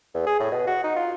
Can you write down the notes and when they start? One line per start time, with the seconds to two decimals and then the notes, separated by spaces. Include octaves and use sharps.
0.14 E2
0.26 G#4
0.40 A2
0.52 B2
0.67 F#4
0.84 D#4
0.96 F4